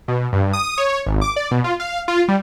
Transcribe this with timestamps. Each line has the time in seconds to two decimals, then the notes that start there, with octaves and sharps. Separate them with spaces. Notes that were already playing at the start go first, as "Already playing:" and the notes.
0.08 B2
0.33 G2
0.53 D#6
0.78 C#5
1.06 G#1
1.21 D6
1.36 D5
1.51 B2
1.64 F4
1.80 F5
2.08 F4
2.28 G3